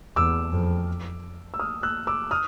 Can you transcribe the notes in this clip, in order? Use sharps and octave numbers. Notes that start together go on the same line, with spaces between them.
E2 D6 E6
F2
E6
D#6 F6
E6 F#6
D6 E6
D#6 F6